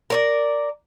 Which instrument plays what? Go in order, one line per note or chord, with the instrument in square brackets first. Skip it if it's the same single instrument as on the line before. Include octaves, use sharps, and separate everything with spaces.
[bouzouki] A#4 C#5 D5